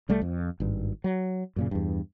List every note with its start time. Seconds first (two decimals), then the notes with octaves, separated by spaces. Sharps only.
0.09 C2 G3 A3
0.22 F2
0.60 G#1 G2
1.04 F#3
1.56 F#2 A#2 C#3
1.71 E2 G2